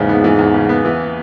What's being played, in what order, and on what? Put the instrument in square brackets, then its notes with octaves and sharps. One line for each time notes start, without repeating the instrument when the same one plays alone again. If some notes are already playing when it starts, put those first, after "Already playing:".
Already playing: [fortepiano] E2 C#3 E3 [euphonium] G#2
[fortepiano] B3
E3
E2
C#3
B3
E3